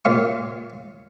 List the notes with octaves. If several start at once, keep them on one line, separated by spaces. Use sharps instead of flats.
A#2 C#5 F5 C#6